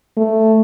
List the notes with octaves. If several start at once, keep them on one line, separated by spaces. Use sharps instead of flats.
A3